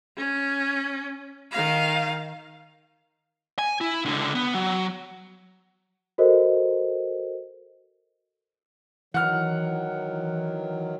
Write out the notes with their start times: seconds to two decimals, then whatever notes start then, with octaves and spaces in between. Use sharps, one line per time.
0.17 C#4
1.52 D#3 F5
3.59 G#5
3.81 E4
4.06 C#2 D3
4.35 B3
4.54 F#3
6.18 F#4 A4 A#4 C5 D#5
9.14 D#3 E3 F#3 F#5 F6